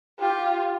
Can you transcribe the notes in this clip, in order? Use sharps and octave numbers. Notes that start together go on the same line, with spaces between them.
F4 G4